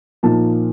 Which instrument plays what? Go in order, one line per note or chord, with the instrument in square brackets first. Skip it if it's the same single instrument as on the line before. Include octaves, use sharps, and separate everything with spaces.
[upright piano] A#2 F3 A#3 D#4 A5